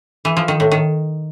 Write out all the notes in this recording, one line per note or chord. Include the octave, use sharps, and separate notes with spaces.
E3
F3
D#3
A2
D#3